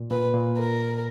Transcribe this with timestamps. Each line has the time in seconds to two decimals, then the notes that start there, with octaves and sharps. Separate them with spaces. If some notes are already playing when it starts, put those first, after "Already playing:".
Already playing: A#2
0.10 A#2 B4
0.34 A#2
0.58 A#4